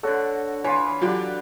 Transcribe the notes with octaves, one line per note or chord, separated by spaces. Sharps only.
D3 F#4 A4 C#5
E3 F4 C#5 G#5
E3
D3 F#3 D4 F4 G4